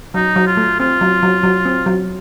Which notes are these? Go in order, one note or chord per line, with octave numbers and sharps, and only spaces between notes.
F#3 D#4
F#3
F4
A3
C4 F4
F#3
F#3
F#3
C4
F#3